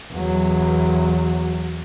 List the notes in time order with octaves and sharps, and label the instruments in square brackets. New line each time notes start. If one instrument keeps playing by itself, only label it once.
[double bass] E2 F#3